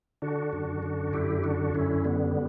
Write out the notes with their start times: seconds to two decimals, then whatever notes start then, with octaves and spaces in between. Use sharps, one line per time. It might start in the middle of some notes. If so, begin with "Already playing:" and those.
0.22 D3 D4 F#4
0.53 F#2
0.83 D3
1.13 F#2 E4 G4
1.44 D3 D4 F#4
1.74 F#2 C#4 E4
2.04 D3 G3 B3